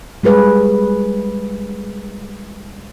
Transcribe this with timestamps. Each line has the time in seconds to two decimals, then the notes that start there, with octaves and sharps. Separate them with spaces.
0.23 G3 G#3 G#4 B4